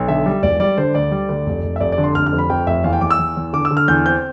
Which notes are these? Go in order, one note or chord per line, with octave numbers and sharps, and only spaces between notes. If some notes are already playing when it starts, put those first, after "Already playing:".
Already playing: B1
D3 E5
G3
E1 D5
G3 D5
D3 C5
D2 D5
G3
D2
F1
F1
E5
F1 D5
D5
D3
C6
F1 F6
F6
F2
B5
F2 G5
F1 E5
E2 F5
G5
E2 D6
E6
E2
E2
D3 D6
E6
D3
F6
E2 G6
C4 G6